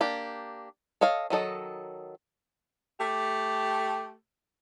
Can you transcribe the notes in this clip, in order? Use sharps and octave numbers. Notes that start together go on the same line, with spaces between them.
A#3 D4 G4
A4 C#5 D#5 F5
D#3 F#3 A4 D#5
A3 G4